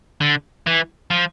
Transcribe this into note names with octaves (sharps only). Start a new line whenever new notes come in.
D3
E3
F3